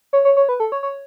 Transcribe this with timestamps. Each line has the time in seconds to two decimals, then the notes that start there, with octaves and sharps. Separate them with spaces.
0.13 C#5
0.25 C#5
0.37 C#5
0.49 B4
0.60 A4
0.72 C#5
0.83 C#5